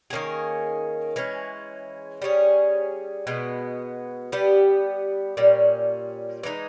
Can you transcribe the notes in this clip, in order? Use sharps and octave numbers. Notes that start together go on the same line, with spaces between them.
D#3 A#3 C#4 G#4
E3 G#3 C#4
G3 C#4 G#4
B2 G#3 B3
G3 B3 G4
A#2 G3 C#4
E3 G#3 D#4